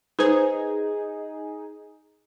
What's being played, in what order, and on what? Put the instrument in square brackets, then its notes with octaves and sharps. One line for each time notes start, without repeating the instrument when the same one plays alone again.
[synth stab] D#4 G#4 [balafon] B4 C5